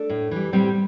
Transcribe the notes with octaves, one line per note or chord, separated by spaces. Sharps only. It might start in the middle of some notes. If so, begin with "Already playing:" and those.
Already playing: A3 D4
A2
E3 G3
A2 G3 C4